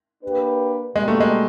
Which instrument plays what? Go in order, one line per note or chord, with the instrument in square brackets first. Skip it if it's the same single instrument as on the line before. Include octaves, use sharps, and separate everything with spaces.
[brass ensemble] A#3 D4 G4 B4
[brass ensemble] B2 G3 A#3 [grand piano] G#3
[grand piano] A3
G#3